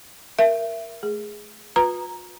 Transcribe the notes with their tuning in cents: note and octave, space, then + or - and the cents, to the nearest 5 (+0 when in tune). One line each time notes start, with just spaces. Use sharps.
A#4 +0 E5 +25
A3 -30 G#4 +0
F4 +45 B4 -10 A#5 +0